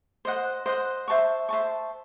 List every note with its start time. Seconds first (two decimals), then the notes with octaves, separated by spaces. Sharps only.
0.25 C5 D#5 F#5
0.66 C5 D#5 F#5
1.08 C5 E5 A5 C#6
1.49 C5 E5 A5 C#6